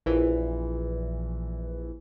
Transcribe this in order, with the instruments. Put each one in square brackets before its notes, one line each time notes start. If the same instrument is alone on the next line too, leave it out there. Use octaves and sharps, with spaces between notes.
[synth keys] A#1 E3